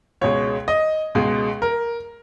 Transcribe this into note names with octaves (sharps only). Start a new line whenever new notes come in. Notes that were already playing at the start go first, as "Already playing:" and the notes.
C#2 B2 G#3 C#5
D#5
C#2 B2 G#3
A#4